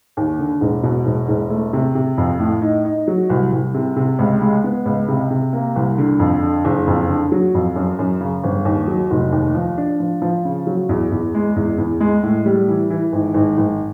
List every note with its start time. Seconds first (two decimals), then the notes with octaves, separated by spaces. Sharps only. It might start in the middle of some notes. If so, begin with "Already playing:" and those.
0.17 D#2
0.39 D3
0.61 E1
0.83 B2
1.06 E1
1.28 E1
1.50 A3
1.73 C3
1.95 C3
2.18 F2
2.39 A2
2.62 D#4
2.85 D#4
3.08 F#3
3.30 C2
3.52 C2
3.74 C3
3.96 C3
4.19 C#2
4.41 G#3
4.64 B3
4.86 C#2
5.08 C3
5.30 C3
5.53 A#3
5.76 C2
5.98 D3
6.19 F2
6.42 D3
6.65 F#1
6.87 F2
7.09 D3
7.32 F#3
7.54 F2
7.76 F#2
7.99 F#2
8.20 C#3
8.43 G1
8.65 D#2
8.88 F#3
9.11 F1
9.32 D#2
9.55 F3
9.78 D4
10.00 F3
10.22 F3
10.45 C#3
10.67 F#3
10.89 E2
11.12 E2
11.34 G#3
11.56 E2
11.78 E2
12.00 G#3
12.23 A2
12.46 G3
12.68 E3
12.90 E3
13.13 G#1
13.34 G#1
13.57 G#1